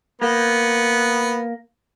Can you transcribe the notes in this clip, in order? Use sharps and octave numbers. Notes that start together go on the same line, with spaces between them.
A#3 B3